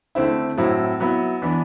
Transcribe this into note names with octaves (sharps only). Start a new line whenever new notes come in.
D3 A3 C4 E4
A2 F#3 C4 E4
F#3 B3 E4
E3 B3 D4